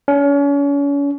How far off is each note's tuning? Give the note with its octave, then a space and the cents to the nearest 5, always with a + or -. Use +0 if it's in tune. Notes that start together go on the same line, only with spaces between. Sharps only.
C#4 +35